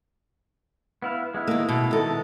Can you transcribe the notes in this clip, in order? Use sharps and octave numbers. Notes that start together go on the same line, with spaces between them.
B3 E4 F5
G#3 B3 E4
D#3 A#3
B2
D#3 A4